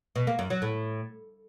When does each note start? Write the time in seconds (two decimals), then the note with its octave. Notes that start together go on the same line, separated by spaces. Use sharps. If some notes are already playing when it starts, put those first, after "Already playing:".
0.16 B2
0.27 A#3
0.39 F#2
0.50 F#3
0.62 A2